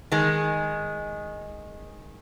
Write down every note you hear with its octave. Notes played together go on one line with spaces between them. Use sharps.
D#3 G#3